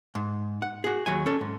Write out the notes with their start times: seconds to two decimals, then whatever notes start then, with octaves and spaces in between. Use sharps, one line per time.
0.15 G#2
0.62 F#5
0.84 F#4 G#4
1.06 D#2 F#3 G#5
1.26 C#4 A4
1.41 G#2